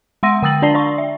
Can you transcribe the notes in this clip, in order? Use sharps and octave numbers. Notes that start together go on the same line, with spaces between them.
G#3 F#5 C6 E6 A#6 D#7
D3 G5 D#6 E6 A6 F#7
D4 D5 A5 C7 G7
D5 C6 C#6
E5